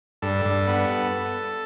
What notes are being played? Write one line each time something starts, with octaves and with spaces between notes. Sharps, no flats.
G2 A4
G2
B3